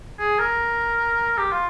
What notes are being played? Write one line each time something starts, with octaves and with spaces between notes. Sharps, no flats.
G#4
A#4
G4
F4